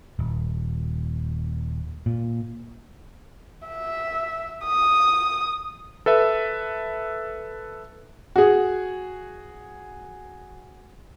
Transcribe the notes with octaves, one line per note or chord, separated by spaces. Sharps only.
D#1
A#2
E5
D#6
A4 B4 E5
F#4 G#4